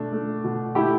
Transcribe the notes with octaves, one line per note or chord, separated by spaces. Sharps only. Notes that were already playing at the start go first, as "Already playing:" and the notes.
Already playing: B2 A3 D4
A3
B2
A3 E4 G4